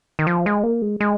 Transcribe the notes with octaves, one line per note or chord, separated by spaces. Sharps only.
D#3
F3
G#3
A#3
G#3
G#3